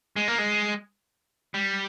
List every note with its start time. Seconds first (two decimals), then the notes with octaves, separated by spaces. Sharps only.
0.16 G#3
0.28 A#3
0.38 G#3
1.54 G3